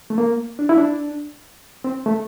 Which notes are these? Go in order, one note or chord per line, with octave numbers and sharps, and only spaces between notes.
A3
A#3
D4
E4
D4
C4
A3